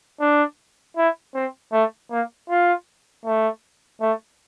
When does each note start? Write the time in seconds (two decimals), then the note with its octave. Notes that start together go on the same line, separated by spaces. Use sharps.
0.20 D4
0.97 E4
1.34 C4
1.72 A3
2.10 A#3
2.50 F4
3.25 A3
4.01 A3